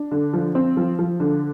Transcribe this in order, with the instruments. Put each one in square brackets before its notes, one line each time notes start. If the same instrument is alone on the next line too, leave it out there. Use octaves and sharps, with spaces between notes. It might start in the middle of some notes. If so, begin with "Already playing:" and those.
Already playing: [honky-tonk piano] D4
D3
F3
C4
F3
F3
D3